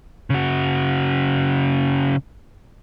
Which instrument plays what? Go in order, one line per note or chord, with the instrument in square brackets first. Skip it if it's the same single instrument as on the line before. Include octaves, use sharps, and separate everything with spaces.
[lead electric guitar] C#3 F#4